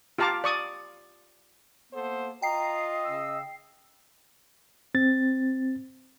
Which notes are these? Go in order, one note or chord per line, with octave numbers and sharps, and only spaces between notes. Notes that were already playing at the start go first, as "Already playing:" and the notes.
F4 G4 F5 A5 A#5 D6
D5 C#6 D#6
A#3 B3 A4 C5
F4 D#5 G5 A#5 C7
C#3 C#4 E6
C4 A6